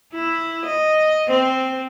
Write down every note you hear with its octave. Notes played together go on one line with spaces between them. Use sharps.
E4
D#5
C4 C5